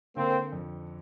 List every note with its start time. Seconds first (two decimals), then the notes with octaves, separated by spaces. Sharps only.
0.16 D3 A#3 C4
0.52 F2